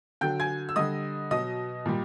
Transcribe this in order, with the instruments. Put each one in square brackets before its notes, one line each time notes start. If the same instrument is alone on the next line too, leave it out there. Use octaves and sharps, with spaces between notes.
[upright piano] D3 F#3 G5 G6
G#5 G#6
E6
D3 G3 D#5 D#6
B2 F#3 D#5 D#6
A#2 G3